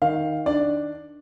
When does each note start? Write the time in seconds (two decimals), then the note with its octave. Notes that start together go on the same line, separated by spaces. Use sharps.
0.02 D#3 F5
0.46 D4 D5